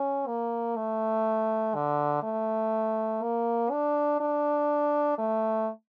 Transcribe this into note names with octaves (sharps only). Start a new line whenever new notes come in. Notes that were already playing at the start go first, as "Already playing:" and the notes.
Already playing: C#4
A#3
A3
D3
A3
A#3
D4
D4
A3